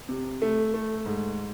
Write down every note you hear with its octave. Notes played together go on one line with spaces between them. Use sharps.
C3
A3
A3
G#2